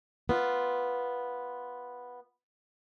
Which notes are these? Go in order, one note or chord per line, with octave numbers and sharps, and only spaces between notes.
B3 F4